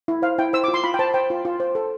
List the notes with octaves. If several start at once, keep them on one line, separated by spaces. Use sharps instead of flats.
E4
C5 F5
E4 G5
C5 E6
D6
F4
C6
F4 B5
G5
C5 A5
C5 G5
F4
F4
C5
A4